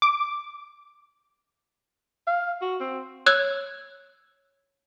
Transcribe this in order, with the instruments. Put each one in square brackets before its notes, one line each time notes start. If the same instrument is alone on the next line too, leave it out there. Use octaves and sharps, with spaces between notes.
[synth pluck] D6
[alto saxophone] F5
F#4
C4
[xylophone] C#5 E6 F#6 G#6